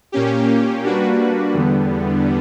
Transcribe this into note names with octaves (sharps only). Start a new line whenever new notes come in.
A#2 A#3 C#4 G4
G3 A#3 D4 F#4 B4
E2 D3 G3 B3